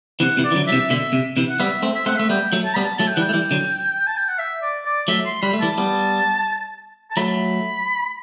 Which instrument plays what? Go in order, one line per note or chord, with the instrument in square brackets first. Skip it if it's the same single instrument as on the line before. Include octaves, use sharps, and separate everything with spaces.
[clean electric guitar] C3 E3 [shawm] F#5
[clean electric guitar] C3 E3
[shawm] D5
[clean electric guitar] E3
D3 F#3
[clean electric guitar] F#3 [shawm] E5
[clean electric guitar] C3 E3
[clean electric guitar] B2 D3 [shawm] E5
[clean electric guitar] C3
C3 E3
[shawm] F#5
[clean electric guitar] G3 B3 [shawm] E5
[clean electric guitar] A3 C4
[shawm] E5
[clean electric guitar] A3 C4 [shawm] F#5
[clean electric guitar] A3 [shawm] E5
[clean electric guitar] G3 B3 [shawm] G5
[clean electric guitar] F#3 A3
[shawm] A5
[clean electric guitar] G3 B3 [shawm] B5
[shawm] A5
[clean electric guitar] F#3 A3 [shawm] A5
[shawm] G5
[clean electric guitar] E3 G3 [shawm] F#5
[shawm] G5
[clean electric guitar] A3
E3 G3
D3 F#3
[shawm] A5
G5
F#5
E5
D5
D5
[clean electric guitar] F#3 A3 [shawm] E5
[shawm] C6
[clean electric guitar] G3 [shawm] B5
[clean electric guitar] A3
[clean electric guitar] E3 G3 [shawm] A5
[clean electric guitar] G3 B3
[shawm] A5
[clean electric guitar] F#3 A3 [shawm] B5